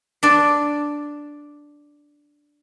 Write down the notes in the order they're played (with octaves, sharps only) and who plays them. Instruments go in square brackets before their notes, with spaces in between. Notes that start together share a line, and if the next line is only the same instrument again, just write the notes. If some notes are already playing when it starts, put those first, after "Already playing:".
[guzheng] D4 D5